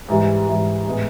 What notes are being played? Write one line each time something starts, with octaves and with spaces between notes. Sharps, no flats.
G#2 E3 G3
G#2 E3 G3
A2 E3 G#3 B3